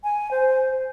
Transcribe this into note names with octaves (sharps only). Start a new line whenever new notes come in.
G#5
C5